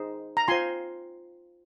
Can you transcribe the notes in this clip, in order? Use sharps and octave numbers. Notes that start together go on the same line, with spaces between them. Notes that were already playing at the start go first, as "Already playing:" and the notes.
Already playing: D#4 G#4 C5
A#5
F4 C5 G#5 C6